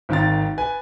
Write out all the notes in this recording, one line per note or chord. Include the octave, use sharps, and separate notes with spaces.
G#1 D#3 F5 A6
B4 G#5